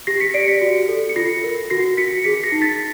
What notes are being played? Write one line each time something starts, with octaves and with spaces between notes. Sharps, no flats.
G4 A#6 C7
B6 C#7
D5 C7 D7
B6 C#7
F#4
A4
C#7
F4 A#6 C7
A#4
F#4 A#6 C7
F#4 B6 C#7
G#4 B6 C#7
A#6 C7
D#4
A6 B6